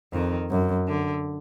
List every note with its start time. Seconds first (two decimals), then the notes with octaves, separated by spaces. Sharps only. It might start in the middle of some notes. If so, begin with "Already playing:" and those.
0.13 F2 D#3
0.51 F#2
0.88 D3